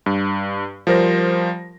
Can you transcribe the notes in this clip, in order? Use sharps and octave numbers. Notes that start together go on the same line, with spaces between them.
G2
F3 G3 A#4 C5 A#6